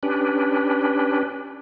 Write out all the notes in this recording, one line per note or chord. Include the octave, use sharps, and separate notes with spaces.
C#4 D4 G4 B4